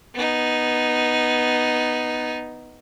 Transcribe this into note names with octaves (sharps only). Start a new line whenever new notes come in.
B3 D#4